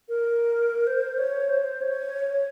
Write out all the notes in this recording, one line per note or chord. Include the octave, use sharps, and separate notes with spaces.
A#4
C5
C#5
C5
C#5